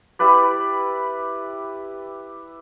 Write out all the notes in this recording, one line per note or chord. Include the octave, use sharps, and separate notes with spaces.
E4 G4 B4 D5